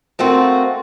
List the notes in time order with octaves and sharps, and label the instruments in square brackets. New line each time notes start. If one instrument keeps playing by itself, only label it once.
[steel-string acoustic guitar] A3 A#3 C4 F#4